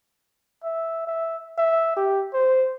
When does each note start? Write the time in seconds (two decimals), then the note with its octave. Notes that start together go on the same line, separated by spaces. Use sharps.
0.64 E5
1.07 E5
1.58 E5
1.97 G4
2.34 C5